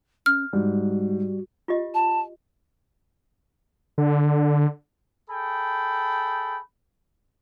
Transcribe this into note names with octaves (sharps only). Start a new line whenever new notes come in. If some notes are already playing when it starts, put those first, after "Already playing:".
C#4 F6
G#2 G3 F#4
F4 G4 D#5
A5
D3
G#4 A4 G5 B5